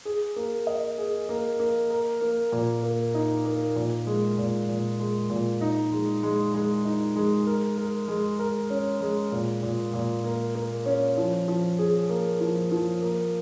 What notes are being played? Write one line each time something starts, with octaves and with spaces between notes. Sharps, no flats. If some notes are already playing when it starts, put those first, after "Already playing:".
G#4
A#3
D#5
G#4
A#3
A#3
A#4
A#3
A#2
A#3
D#4
A#3
A#2
G#3
A#2
A#2
G#3
A#2
D#4
G#3
G#3
G#3
D#4
G#3
A#4
A#4
G#3
A#4
C#4
G#3
A#2
A#2
A#2
A#3
A#3
C#4
F3
F3
G#4
A#3
F3
F3
A#3